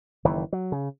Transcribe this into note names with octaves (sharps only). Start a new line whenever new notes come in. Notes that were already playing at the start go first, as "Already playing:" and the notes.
F#1 D#3 E3
F#3
C#3